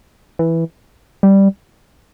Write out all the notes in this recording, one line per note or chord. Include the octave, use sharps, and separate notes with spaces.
E3
G3